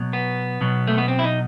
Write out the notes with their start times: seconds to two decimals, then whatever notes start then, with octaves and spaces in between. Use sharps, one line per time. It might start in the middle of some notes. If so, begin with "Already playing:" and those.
Already playing: B2 F#3
0.13 B3
0.61 B2 F#3
0.87 A3
0.98 B3
1.08 C4
1.19 E4
1.24 D#4